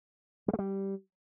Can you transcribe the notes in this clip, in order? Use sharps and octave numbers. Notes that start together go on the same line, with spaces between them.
G3
A3
G3